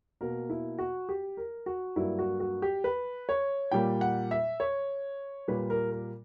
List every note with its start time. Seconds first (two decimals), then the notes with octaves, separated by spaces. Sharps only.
0.21 B2 A#3 A#4
0.50 E4
0.78 F#4
1.09 G4
1.37 A#4
1.66 F#4
1.96 G2 F#3 A#3 E4
2.19 F#4
2.40 F#4
2.62 G4
2.84 B4
3.29 C#5
3.72 A#2 G3 A#3 G5
4.01 F#5
4.31 E5
4.60 C#5
5.48 A#2 G3 A#3 B4
5.70 A#4
5.92 A#4